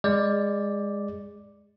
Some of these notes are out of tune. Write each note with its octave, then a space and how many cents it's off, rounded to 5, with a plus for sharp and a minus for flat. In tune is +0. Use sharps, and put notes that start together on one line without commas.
G#3 -15 D5 +0